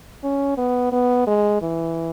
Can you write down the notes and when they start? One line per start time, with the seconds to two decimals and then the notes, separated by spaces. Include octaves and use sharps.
0.23 C#4
0.57 B3
0.92 B3
1.27 G#3
1.62 E3